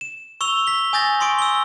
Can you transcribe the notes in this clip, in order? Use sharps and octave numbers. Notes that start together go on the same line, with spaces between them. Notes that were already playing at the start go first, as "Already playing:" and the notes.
E7
C#6 E6 F7 G7
B6 G7
G#5 D#6 G6 A6 A#6
C6 C#6 D#6 D7
E6 G7